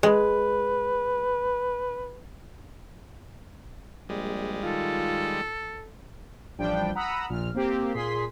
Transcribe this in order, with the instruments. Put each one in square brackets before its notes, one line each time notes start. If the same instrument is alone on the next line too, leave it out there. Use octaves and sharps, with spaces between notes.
[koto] G#3 [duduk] B4
[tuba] A#1 [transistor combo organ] G3 G#3
[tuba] D#3 [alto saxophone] F4 [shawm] A4
[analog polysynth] A1 F3 G3 D4 G5
F#5 A#5 B5 D#6 E6
A#1 A#2 F6
A#3 C4 G4
A#2 G#4 C6 B6